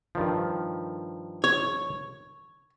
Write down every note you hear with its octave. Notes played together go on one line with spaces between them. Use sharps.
G2 D#3 F3
C#5